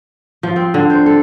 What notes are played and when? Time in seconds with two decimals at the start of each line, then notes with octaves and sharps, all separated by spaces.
0.43 F3
0.56 C4
0.74 D3
0.90 C5
1.06 A4